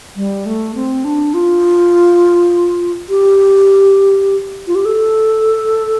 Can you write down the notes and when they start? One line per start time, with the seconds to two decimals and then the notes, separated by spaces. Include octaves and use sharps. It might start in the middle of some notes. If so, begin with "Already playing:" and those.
0.16 G3
0.46 A3
0.75 C4
1.05 D4
1.34 F4
3.10 G4
4.67 F4
4.75 G4
4.85 A4